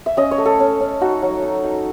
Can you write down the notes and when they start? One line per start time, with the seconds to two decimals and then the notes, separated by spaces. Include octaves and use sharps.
0.06 E5
0.17 C#4 D#5
0.31 C#5
0.38 A3
0.45 A4
0.60 C#4
0.80 C#4
1.01 D#4 F#4
1.22 F#3
1.42 D#4
1.64 D#4